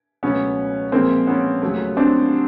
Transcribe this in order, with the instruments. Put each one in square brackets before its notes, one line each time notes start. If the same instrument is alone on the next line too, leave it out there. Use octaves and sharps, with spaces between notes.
[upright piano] C#2 B2 F#3 A3 B3 C#4
A#2 F3 G#3 A#3 C4
B3 C#4
D#2 C#3 F#3 A3
C4 D4